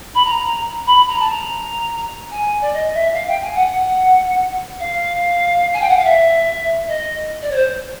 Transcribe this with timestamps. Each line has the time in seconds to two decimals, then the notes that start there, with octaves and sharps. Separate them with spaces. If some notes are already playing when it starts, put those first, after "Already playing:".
0.15 B5
0.25 A#5
0.86 B5
1.08 A#5
1.20 A5
1.31 A#5
2.31 G#5
2.61 D5
2.73 D#5
2.94 E5
3.14 F5
3.28 G5
3.42 G#5
3.55 F#5
4.80 F5
5.73 G#5
5.81 G5
5.89 F#5
5.97 F5
6.04 E5
6.88 D#5
7.42 D5
7.51 C#5
7.55 C5